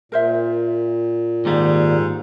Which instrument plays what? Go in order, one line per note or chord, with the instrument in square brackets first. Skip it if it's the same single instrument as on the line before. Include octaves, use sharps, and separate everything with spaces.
[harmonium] A#2 [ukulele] A#4 C5 E5
[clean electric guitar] D#2 G3 [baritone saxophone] G#2